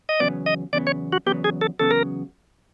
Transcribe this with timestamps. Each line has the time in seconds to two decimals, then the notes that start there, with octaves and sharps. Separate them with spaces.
0.09 D#5
0.20 E2 C#3 F#3 B3 D5
0.46 D#5
0.73 E2 C#3 F#3 B3 D5
0.87 C#5
1.12 F#4
1.26 E2 C#3 F#3 B3 G4
1.44 G#4
1.61 A4
1.79 E2 C#3 F#3 B3 A4
1.91 A#4